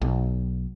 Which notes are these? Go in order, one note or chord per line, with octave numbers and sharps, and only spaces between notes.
B1